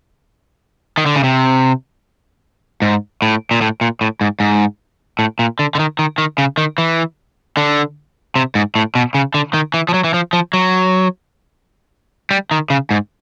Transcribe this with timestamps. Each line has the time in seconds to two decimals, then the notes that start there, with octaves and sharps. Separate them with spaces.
0.98 D#3
1.06 D3
1.15 C#3
1.24 C3
2.82 G#2
3.22 A2
3.51 A#2
3.61 A2
3.81 A#2
4.01 A2
4.21 G#2
4.40 G#2
5.19 A2
5.39 A#2
5.59 D3
5.75 D3
5.79 D#3
5.99 D#3
6.18 D#3
6.38 C#3
6.58 D#3
6.78 E3
7.57 D3
8.36 C3
8.55 G#2
8.76 A2
8.95 B2
9.15 C#3
9.34 D3
9.54 D#3
9.74 E3
9.89 F3
9.94 F#3
10.04 E3
10.14 F3
10.33 F3
10.54 F#3
12.31 G3
12.51 D#3
12.70 C#3
12.91 G#2